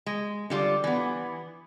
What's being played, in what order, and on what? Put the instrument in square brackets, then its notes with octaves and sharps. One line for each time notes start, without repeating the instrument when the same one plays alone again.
[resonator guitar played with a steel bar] G#3
D3 G3 F4
E3 B3